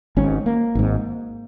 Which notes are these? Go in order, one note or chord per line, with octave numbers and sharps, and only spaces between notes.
G#1 G#2 C#4
A#3
G#1 G#2